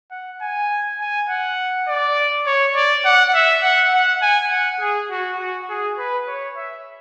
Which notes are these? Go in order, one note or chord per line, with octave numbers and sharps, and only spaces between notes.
F#5
G#5
G#5
F#5
D5
C#5
D5
F#5
E5
F#5
F#5
G#5
F#5
G#4
F#4
F#4
G#4
B4
C#5
E5